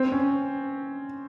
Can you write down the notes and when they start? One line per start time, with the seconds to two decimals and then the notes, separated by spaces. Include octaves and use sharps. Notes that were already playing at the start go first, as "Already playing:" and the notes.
Already playing: C4
0.12 C#4